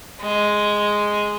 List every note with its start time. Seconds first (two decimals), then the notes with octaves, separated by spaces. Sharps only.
0.21 G#3